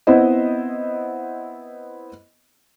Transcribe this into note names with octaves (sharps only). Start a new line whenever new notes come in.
B3 C4 E4 C5 D#5